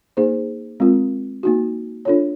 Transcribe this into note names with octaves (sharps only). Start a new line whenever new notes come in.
A#3 D#4 G#4 C5
G#3 C4 F4 A#4
A#3 D#4 F#4
D4 F4 A4 C#5